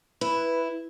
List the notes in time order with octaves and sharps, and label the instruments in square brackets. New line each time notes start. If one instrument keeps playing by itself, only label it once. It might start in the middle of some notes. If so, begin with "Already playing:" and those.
[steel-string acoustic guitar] E4 [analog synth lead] B4